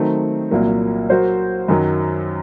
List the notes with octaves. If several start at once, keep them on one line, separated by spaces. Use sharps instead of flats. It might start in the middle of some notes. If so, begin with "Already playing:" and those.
Already playing: D#3 F#3 A3 C4 D#4
C2 A#2 F#3 A#3
F#3 A#3 F#4 C5
F#2 D#3 F#3